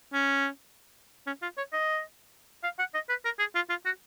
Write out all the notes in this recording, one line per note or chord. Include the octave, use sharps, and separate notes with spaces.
C#4
C#4
F4
C#5
D#5
F5
F#5
D#5
B4
A#4
G#4
F4
F4
F#4